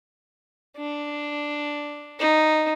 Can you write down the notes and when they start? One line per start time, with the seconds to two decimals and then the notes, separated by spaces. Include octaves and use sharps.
0.77 D4
2.19 D#4